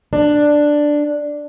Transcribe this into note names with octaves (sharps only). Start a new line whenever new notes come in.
D4